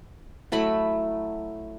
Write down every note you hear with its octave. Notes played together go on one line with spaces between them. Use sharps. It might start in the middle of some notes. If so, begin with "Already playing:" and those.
F#3 A3 E4 B5